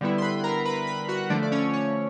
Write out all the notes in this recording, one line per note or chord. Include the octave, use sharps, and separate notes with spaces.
D3 G3 B3 E4
C6
B4 B5
A#4 A#5
B4 B5
B4 B5
F#4 F#5
D3 F3 A3 D4 D5
D5
C#4 C#5
C#4 C#5